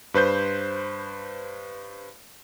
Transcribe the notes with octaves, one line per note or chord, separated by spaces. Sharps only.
G2 B4 C5 G6